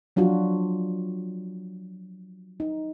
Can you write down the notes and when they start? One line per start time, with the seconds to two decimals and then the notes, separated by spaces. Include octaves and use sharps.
0.16 F3 F#3 D4 F4 F#4
2.60 D#4